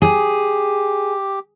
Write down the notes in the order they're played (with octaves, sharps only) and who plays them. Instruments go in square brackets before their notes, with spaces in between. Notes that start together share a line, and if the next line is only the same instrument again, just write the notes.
[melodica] G4 [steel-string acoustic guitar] G#4